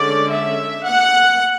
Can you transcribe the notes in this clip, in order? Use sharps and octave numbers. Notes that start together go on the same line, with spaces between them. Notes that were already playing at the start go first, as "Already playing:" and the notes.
Already playing: D3 G#3 C#4 D5
E5
F#5